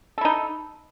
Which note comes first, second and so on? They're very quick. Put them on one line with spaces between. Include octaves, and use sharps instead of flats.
A4 E4 D#4